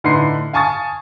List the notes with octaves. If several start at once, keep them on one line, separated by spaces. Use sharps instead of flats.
A2 D3 D#4 B4 C6 C7
F5 G#5 A5 C#6 D#6 A6